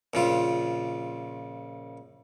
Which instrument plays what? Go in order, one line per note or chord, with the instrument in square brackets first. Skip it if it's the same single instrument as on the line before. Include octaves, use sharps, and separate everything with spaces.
[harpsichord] A#1 C#3 F4